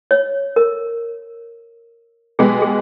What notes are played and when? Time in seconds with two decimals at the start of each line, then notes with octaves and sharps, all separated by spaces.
0.11 C#5
0.56 A#4
2.39 B2 G#3 B3 G4 G#4
2.62 G#4